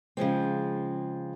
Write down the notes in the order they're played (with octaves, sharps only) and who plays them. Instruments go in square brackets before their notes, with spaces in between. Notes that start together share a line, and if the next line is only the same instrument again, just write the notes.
[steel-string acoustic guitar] C#3 F3 G#3 C4